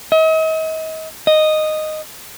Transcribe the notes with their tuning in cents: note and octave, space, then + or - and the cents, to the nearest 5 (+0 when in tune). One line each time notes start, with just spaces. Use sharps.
D#5 +40
D#5 -10